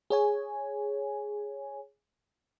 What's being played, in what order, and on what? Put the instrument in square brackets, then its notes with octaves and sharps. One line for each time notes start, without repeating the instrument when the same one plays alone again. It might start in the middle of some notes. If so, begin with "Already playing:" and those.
[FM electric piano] G#4 C#5 G#5